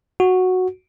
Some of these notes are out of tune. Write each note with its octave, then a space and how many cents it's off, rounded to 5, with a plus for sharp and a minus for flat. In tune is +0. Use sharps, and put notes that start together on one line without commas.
F#4 -5